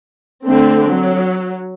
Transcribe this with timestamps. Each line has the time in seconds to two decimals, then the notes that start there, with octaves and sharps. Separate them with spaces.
0.46 D3 A3 C4
0.91 F#3